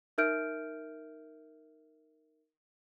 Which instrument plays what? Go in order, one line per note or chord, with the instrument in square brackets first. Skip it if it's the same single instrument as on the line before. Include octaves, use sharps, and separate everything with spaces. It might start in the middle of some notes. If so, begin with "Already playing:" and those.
[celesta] D#4 A#4 E5 F6 G6 D7